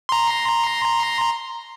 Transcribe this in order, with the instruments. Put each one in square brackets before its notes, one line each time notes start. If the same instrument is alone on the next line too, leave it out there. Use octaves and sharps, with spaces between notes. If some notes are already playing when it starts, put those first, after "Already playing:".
[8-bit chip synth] A#5 C6